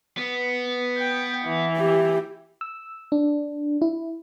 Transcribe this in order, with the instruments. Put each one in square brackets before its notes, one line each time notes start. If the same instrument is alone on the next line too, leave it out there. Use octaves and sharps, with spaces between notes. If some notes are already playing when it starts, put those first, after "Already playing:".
[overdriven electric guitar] B3
[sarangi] G5
E3
[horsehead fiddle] G4
[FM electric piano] E6
D4
E4